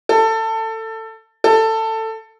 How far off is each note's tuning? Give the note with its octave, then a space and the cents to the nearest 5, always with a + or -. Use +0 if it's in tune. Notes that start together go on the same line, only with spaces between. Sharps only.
A4 +20
A4 +15